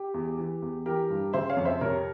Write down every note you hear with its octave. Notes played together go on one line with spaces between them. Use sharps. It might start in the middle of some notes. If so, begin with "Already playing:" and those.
Already playing: G4
E2
E3
E2
E3 G4 A#4
G2
C#3 C5 E5
C#5 F5
F2
C5 E5
C3 A#4 C#5